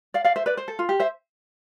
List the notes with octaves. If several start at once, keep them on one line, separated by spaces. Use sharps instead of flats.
D5 F5
D5 F5
C5 E5
B4 D5
C5
A4
F4
G4
C5 E5